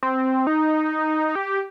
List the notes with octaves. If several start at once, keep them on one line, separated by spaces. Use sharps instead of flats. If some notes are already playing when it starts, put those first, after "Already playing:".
C4
D#4
G4